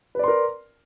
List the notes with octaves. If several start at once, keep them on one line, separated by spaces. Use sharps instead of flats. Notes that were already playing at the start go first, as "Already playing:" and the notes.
A#4 B4 D5 C6